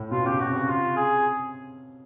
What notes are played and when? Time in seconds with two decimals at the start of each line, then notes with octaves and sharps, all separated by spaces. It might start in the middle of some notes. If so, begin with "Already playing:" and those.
Already playing: A2
0.11 B2 F4
0.25 C#3 G4
0.39 C#3 F#4
0.49 C3
0.54 C#3 F#4
0.68 C3 F4
0.96 G#4